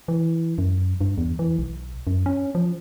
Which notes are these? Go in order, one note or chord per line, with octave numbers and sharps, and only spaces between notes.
E3
F#2
G2
E2
E3
B1
F#2
C#4
F3